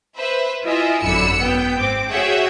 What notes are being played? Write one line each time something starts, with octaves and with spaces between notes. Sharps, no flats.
B4 C5 E5
E4 F4 D#5 E5 G#5
G#1 F#2 D3 B5 E6 C#7
B3 G5
G#2 C4 D6
F#4 G#4 C#5 E5 F#5 G5